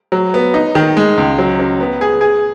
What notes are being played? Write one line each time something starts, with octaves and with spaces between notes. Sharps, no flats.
F#3
B3
D#4
D#3
G#3
C#2
F#3
C#4
B3
G#4
G#4